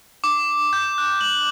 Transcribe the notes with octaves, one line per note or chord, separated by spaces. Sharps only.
D6
G6
F#6
F#7